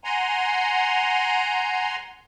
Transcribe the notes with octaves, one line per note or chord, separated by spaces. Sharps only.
F#5 G#5 A#5 C6